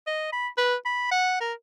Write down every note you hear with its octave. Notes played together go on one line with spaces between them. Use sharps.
D#5
B5
B4
B5
F#5
A#4